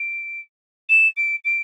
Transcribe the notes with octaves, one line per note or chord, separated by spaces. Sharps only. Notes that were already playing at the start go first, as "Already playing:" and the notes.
Already playing: D7
E7
D7
D7